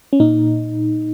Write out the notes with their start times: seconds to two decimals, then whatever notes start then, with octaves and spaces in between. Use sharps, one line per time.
0.13 C#4
0.20 A#2 D#4